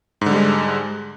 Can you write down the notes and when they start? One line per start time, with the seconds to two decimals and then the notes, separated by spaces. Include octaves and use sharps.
0.21 G#2
0.26 D3
0.31 G3
0.36 G#3